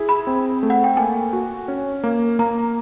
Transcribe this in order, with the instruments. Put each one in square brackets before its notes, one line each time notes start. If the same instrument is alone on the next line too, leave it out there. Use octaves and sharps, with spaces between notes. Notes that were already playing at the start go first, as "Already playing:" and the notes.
Already playing: [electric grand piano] E4 G#4
[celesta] B5
[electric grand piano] C4
A3
[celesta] F#5
G5
[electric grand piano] A#3 [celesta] G#5
[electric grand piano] F#4
C#4
A#3
[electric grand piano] A#3 [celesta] A#5